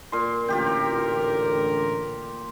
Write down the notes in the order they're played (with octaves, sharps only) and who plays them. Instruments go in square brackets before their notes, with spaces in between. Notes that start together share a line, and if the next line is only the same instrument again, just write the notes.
[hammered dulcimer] A#2 C6
[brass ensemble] A1 D3 A#4 [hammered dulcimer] F4 G4 G5